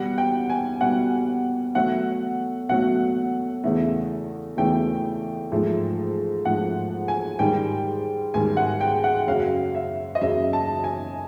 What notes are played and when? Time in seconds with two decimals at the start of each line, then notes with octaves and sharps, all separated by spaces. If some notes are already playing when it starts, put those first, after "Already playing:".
Already playing: B2 G3 F#5
0.18 G5
0.50 G#5
0.81 B2 G3 F#5
1.75 B2 F#3 A3 F#5
2.69 B2 F#3 A3 F#5
3.64 E2 C#3 E3 A3
4.57 E2 C#3 E3 A3 G5
5.52 G#2 F3 A3
6.45 G#2 F3 A3 F#5
7.08 G#5
7.39 G#2 D#3 G3 G5
8.34 G#2 D#3 G3 G#5
8.57 F#5
8.81 G5
9.04 F#5
9.27 F#2 C#3 F#3 F5
9.75 E5
10.15 D#5
10.21 F#2 C#3 F#3 E5
10.53 A5
10.84 G#5